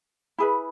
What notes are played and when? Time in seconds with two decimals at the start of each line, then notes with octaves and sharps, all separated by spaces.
0.38 E4 G#4 B4